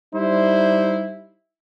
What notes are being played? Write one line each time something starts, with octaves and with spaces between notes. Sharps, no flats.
G3 D#4 E4 C5